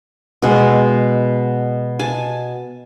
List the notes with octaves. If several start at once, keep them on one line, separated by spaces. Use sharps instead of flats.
B2 G#3
G#5 A5